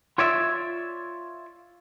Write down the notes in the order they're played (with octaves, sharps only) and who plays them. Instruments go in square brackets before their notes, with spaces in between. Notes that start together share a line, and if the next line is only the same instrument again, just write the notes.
[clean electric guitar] F4 C#5 D5 E5